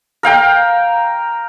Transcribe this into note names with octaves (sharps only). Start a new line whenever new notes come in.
A#4 F5 G5